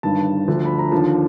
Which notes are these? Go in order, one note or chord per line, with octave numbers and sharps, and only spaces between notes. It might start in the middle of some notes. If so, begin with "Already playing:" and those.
G1 G2 D#3 A5
D2 D3 F3
B5
A#5
D#2 D3 F3 A5